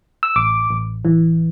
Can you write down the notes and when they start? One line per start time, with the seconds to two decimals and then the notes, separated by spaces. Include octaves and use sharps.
0.23 E6
0.36 A1 D6
0.70 A1
1.05 E3